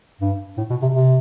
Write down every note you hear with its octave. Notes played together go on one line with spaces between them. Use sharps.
G2
A2
B2
C3
C3